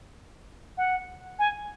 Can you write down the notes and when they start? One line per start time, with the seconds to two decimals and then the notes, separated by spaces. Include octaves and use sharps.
0.77 F#5
1.39 G#5